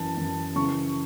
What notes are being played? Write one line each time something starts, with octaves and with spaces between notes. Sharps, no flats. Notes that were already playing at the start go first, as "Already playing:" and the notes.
Already playing: F#2 E3 A5
F#2 E3
F#2 C#3 E3 C#6